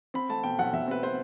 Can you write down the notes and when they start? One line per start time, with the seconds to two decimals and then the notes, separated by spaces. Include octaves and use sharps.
0.14 C4 B5
0.29 A3 A5
0.43 B2 G5
0.59 B1 F#5
0.73 B1 E5
0.88 C4 B4
1.03 C4 C5